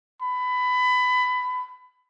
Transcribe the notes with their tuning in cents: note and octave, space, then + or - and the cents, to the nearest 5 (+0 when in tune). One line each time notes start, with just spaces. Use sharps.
B5 +20